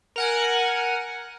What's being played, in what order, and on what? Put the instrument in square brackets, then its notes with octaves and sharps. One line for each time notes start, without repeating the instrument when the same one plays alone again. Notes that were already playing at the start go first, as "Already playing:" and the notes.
[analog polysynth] A#4 F#5 G#5